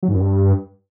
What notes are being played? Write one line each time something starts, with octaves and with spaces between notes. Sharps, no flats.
F#3
G#2
F#2
G2